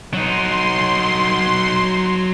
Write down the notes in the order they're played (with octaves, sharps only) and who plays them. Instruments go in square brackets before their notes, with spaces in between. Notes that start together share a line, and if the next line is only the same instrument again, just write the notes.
[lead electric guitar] F#3 D#4 [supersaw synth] C6